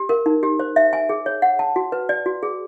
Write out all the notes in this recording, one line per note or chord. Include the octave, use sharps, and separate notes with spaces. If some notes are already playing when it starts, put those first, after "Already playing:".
Already playing: G4
A#4
D#4
G4
C5
E5
G#5
G#4
C#5
F#5
A5
F#4
B4
D5
F#4
G#4